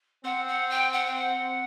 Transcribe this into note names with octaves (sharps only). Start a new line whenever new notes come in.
C4 F#5
F#5
G5
F#5
G5
F#5